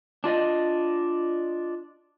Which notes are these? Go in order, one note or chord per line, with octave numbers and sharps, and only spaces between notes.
D4 F4 D5 D#5